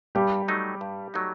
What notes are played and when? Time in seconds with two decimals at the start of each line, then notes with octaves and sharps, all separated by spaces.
0.15 G2 G3 G4
0.48 F#3 A3 D#4
0.81 G2
1.14 F#3 A3 D#4